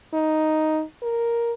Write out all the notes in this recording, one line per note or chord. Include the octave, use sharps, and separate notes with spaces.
D#4
A#4